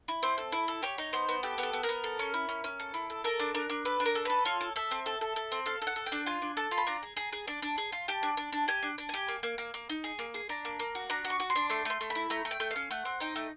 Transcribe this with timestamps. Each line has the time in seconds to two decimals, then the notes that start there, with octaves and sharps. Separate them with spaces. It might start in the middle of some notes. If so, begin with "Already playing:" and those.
0.08 E4
0.23 C4 C5
0.38 A4
0.52 E4
0.68 A4
0.83 G4 C#5
0.98 D#4
1.13 B3 C5
1.29 B3
1.43 G4 A4
1.58 B3
1.63 A4
1.73 B3
1.83 A#4
1.89 B3
2.04 A4
2.19 C#4
2.34 E4
2.49 C#4
2.64 C#4
2.80 A4
2.94 E4
3.10 A4
3.24 A4 A#4
3.39 D4
3.54 D4 A#4
3.70 D4
3.85 A4 B4
4.00 D4
4.05 A#4
4.15 A4
4.25 A4 B4
4.45 F4 C#5
4.61 A4
4.76 A4 E5
4.91 C4
5.06 A4
5.21 A4
5.36 A4
5.52 C4
5.66 A4 F5
5.82 A4
5.87 F#5
5.96 A4
6.06 G5
6.12 D4
6.26 F4 G#5
6.42 D4
6.57 A4 A5
6.71 F4
6.78 B5
6.87 D4 A#5
7.03 G#4
7.17 G#4
7.33 G#4
7.48 D4
7.62 D4
7.78 G#4
7.92 F4
8.08 G4 A5
8.23 D4
8.37 D4
8.52 D4
8.68 G4 G#5
8.83 D4
8.98 D4
9.09 G4 G#5
9.28 A#3
9.43 A#3
9.58 A#3
9.74 A#3
9.89 D#4
10.04 G#4
10.19 A#3
10.34 G#4
10.49 D4 A#5
10.65 A#3
10.80 A#3
10.95 F#4
11.10 D4 A#5
11.25 F#4
11.30 C#6
11.40 F#4
11.50 C6
11.55 D4
11.70 A3 C6
11.85 A3 C6
12.01 A3
12.10 B5
12.15 E4
12.30 A3 A#5
12.45 A3
12.51 G5
12.60 A3
12.71 F5
12.76 C#4
12.91 A3 F#5
13.05 C4
13.20 D#4 G5
13.36 A3